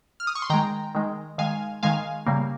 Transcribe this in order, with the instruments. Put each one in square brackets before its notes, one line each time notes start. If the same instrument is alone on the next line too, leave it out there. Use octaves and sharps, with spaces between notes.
[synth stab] F6
D#6
C#6
C6
D#3 G#3 G5 A#5
D#3 G#3
D#3 G#3 F5 G#5
D#3 G#3 F5 G#5
C#3 G3 A#3